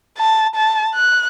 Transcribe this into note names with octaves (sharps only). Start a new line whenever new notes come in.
A5
A5
F#6